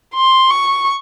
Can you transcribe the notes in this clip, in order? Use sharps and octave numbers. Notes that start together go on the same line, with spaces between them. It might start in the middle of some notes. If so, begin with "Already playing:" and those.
C6
C#6